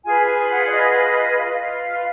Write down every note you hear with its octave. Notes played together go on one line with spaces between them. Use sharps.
F4 G#4 B4 G#5
G#5
F#5
D5
D#5
F4 B4 F5
D#5
F5